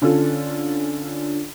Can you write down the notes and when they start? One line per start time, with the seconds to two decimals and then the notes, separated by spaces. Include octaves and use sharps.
0.02 D3 C#4 D4 F4 A4